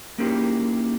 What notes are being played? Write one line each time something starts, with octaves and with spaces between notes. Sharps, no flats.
A#3 C#4 D#4 E4 G4 G#4